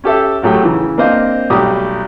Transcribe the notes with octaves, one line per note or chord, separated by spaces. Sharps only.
C#4 G4 A4 E5
A1 F#3 A3 G4 G#4 G5
C#3 E3
A#3 C4 D4 C5 D#5 F5
B1 G3 A3 G4 D#6